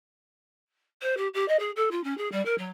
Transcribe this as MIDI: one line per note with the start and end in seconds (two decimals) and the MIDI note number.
1.02 1.17 72
1.17 1.28 67
1.34 1.46 67
1.48 1.57 75
1.59 1.71 68
1.76 1.89 69
1.91 2.02 65
2.04 2.16 61
2.17 2.29 68
2.32 2.43 55
2.45 2.55 70
2.58 2.71 54